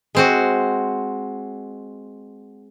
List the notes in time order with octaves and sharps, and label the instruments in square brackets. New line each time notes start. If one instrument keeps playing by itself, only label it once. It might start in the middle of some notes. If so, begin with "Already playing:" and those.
[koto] G#3 C4 F#4